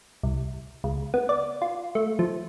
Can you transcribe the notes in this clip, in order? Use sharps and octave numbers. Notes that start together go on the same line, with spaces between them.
C2
C#2
B3
D5
F4
A3
F3